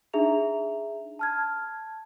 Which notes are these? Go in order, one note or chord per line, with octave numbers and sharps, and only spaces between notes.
D4 D#4 G#4 E5 A#5 F7
A5 F6 G#6